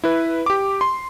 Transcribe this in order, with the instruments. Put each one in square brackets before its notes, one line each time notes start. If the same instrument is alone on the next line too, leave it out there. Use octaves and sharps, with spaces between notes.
[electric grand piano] E4 B4
G4 D6
C6